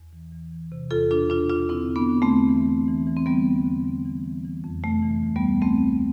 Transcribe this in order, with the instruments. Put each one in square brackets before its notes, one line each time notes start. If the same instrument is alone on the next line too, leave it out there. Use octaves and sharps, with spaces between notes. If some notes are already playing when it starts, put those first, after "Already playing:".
Already playing: [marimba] E2
E3
E3
E3
C3
E2 F4 A4
B2 D4 F4
E2 D4 F4
E2 D4 F4
D3 C4 E4
E2
B3 D4
D3
A3 C4
E2
E3
E3
E3
E3
C4
D3 G3 B3
E2
D3
D3
E3
E3
E3
F2
C3 A3
E3
D2
G3 B3
C3
A3 C4